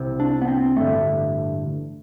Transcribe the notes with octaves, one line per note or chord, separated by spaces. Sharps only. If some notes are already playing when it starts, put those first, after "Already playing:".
Already playing: C2 C3
D4
B3
C4
A1 G2 D3 A3